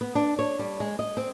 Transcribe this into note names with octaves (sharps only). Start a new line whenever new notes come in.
B3
D4
C#5
G3
G#3
D#5
C4